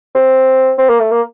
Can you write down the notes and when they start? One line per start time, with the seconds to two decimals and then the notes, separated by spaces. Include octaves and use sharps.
0.15 C4
0.78 C4
0.89 A#3
1.00 A3
1.11 A#3